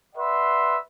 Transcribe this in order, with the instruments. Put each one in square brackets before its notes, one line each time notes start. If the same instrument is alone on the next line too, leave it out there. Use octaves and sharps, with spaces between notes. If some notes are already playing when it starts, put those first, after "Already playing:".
[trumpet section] B4 D5 E5 F#5 C6